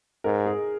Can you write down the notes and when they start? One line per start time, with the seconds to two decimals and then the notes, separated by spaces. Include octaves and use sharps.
0.24 G#2 A#4
0.46 G#4